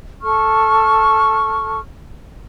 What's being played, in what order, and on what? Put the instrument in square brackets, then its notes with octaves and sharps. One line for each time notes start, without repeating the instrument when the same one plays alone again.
[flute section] A4 C#6 F6